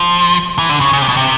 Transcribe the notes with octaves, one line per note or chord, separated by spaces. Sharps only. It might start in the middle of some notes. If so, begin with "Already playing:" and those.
Already playing: F3
E3
D3
C#3
C#3
C3
B2
C3